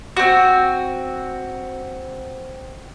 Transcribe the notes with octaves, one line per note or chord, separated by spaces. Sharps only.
C4 F#4